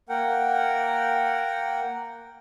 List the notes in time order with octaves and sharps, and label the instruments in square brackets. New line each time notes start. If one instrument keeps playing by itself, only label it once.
[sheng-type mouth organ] A#3 A#4 F#5 G5